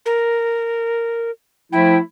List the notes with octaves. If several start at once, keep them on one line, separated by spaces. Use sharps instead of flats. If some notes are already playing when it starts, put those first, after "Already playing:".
A#4
F3 A3 E4 G5